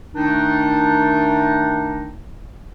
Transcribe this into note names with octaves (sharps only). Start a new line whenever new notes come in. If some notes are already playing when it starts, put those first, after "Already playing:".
D#3 A3 D4 D#4